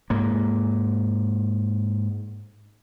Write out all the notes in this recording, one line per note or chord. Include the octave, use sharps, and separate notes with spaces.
G#2 A#3